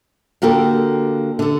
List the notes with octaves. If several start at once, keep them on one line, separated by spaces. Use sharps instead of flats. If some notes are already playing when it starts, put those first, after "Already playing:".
D3 A#3 F#4 G4 A4 A#4
D3 A4